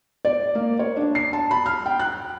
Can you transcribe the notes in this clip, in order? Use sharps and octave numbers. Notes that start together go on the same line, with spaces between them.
D5
A#3
C#5
D4
C7
A5
B5
F6
G5
F#6